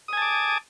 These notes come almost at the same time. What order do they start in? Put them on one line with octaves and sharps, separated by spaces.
D#6 G#5 A5 D6